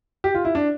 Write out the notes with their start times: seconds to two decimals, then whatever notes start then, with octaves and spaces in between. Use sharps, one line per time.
0.24 G4
0.35 F4
0.45 E4
0.55 D4